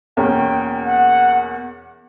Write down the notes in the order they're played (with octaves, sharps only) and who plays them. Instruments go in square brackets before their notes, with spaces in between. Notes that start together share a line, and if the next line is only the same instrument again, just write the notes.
[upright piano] E2 B2 A#3 C#4 [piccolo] G5
[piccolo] F#5